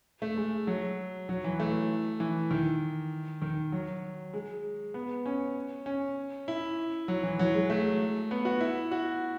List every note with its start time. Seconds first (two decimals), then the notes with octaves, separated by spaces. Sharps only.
0.22 A3
0.38 G#3
0.67 F#3
1.29 F#3
1.44 E3
1.60 A3
2.20 E3
2.51 D#3
3.42 D#3
3.72 F#3
4.34 G#3
4.94 B3
5.26 C#4
5.86 C#4
6.48 E4
7.08 F#3
7.23 E3
7.39 F#3
7.55 G#3
7.70 A3
8.31 B3
8.45 F#4
8.61 E4
8.91 F#4